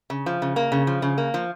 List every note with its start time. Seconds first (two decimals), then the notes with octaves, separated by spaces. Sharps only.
0.10 C#3
0.26 F3
0.42 C#3
0.56 A#3
0.72 C#3
0.87 F3
1.02 C#3
1.18 A#3
1.34 F3